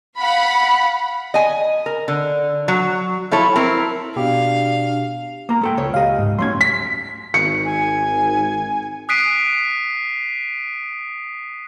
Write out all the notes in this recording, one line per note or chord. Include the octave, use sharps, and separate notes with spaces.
F5 F#5 B5
D#5 G#5
A#4
D3
F#3
F3 E4 A4 C#5
C4 E4 A#4
B2 D4 G4 F5
A#3 A#5
G#3 A4 G5
C#2 C#5
C#2 G4 D#5 F5
G#2
F#3 A3 C#4 C6 G#6
B6
G#1 D#3 C#7
G#5
D#6 F#6 B6 C7 D7 D#7